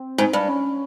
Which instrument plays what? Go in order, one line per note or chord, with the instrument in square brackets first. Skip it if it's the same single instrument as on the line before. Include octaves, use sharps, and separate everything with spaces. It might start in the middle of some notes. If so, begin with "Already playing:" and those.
Already playing: [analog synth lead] C4
[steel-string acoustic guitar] G#2
G2
[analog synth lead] C#4